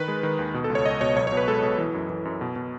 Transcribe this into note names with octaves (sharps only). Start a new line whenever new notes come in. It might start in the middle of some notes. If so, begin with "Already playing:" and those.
Already playing: D#3 B4
G#3
D#3
D#2
B2
A4
C#2
C#5
C#2 D#5
B2 C#5
B1 C#5
C#5
B2
B4
G#3 A4
B2
E3
F#2
E3
F#2
B2
B2